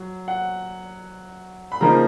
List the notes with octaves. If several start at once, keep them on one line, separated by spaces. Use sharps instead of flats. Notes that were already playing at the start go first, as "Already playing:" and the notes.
Already playing: F#3
F#5
B5
C#3 F3 A#3 D#4 A#5